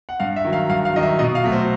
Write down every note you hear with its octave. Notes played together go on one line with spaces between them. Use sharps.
F#5
G2 F5
E5
D#3 F#3
F5
G2 F5
F5
D#3 F#3 D#5
E5
B2 D#5
F5
F#3 A3
C5